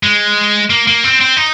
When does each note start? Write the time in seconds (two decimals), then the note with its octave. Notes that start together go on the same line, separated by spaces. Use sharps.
0.03 G#3
0.70 A#3
0.87 A#3
1.04 C4
1.21 C4
1.37 D#4